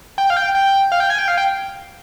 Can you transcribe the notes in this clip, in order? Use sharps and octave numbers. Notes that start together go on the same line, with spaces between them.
G5
F5
G5
G5
F5
G5
G#5
G5
F5
G5